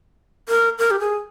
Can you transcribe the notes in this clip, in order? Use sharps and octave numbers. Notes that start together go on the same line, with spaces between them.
A#4
A#4
G4
G#4